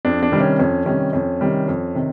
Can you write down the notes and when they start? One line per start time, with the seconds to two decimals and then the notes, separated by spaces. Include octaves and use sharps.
0.05 F2 D4
0.23 D4
0.32 C3 D#3 G3
0.41 C#4
0.59 F2 C#4
0.86 C3 D#3 G3 C#4
1.13 F2 C#4
1.41 C3 D#3 G3
1.68 F2
1.95 C3 D#3